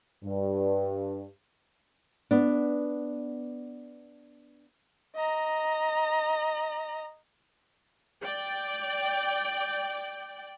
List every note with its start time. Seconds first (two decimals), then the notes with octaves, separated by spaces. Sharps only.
0.23 G2
2.31 B3 D4
5.15 D#5 A#5
8.23 D5 G5